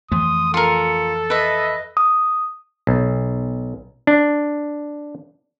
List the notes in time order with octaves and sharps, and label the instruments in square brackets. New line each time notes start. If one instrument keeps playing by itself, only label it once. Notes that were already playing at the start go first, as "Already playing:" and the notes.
[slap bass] F2 E3 A3 [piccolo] C6 [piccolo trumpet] D#6
[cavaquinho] F4 A#4 [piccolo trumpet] A4 [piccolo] C#7
[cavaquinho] B4 E5 [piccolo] D#5
[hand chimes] D#6
[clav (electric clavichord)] B1
D4